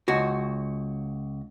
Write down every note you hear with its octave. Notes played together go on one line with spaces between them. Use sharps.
C#2 F#4